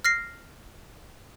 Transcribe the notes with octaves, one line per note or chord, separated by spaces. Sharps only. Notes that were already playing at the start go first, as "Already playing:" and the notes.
F6 A#6 C7